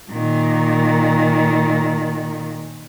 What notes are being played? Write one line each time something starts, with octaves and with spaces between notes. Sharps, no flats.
A#2 D#3